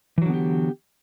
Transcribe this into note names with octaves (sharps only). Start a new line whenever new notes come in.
D3 E3 F#3 B3 G4